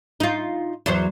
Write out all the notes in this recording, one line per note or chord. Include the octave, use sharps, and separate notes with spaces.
D#4 F4
E2 F#3 C5